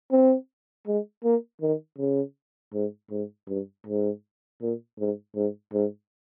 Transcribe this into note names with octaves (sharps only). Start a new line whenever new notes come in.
C4
G#3
A#3
D#3
C#3
G#2
G#2
G2
G#2
A#2
G#2
G#2
G#2